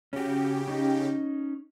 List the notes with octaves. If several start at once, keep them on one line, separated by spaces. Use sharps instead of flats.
C#3 C#4 F#4 G4
C#4 D#4